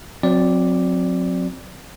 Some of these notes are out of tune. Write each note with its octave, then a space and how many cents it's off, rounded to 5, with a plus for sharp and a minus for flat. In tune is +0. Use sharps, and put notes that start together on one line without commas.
F#3 -35 C4 +0 D5 +0